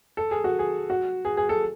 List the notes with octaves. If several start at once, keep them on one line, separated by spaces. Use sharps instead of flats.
A4
G#4
F#4
G#4
F#4
G#4
G#4
A4